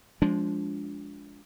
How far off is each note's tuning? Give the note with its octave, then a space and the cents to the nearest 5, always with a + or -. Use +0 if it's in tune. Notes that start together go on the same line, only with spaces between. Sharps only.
F3 +5 G#3 +0 D4 -25